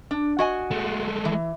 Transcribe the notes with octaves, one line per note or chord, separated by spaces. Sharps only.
D4
F#4 D#5 G#5
G#3 A3
E3